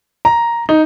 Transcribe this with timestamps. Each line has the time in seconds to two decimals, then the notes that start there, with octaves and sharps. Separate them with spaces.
0.25 A#5
0.69 D#4